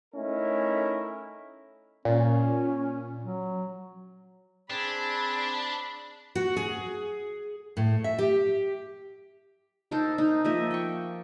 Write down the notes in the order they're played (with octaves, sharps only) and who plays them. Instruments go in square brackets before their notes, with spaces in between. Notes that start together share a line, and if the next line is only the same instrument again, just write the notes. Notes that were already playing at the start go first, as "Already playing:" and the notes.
[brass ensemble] A3 C#4 D#4 E4 A#4
[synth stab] A#2 [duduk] C#4
[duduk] F#3
[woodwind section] C4 G#4 [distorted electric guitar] D4 [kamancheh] B5
[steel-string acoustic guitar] F#4
G#4
A2
E5
G4
[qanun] D#4 A4 A#4 C5
D#4
F3 A#3 D#5 E5
G5 C#6